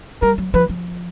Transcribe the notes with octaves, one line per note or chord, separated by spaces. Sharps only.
G3 A#4
F#3
F3 B4
F3